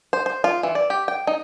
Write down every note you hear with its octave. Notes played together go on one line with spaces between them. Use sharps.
C5
C5
F4
E3
D5
G4
G5
D#4